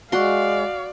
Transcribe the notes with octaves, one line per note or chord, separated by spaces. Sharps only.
G#3 F#4 D5 F5 C6